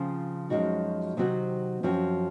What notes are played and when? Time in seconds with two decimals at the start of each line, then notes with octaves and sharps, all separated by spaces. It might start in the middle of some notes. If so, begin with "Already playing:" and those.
Already playing: C#3 F3 C4 F4
0.50 F#2 F3 G#3 D#4 F#4
1.17 C3 D#3 F#3 C4 F#4
1.83 F#2 F3 C4 F#4